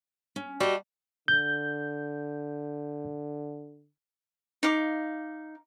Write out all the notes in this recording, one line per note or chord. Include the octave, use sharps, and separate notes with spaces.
C#4
G3 F#4 D#5 A5
D3 G6
D#4 F5 D6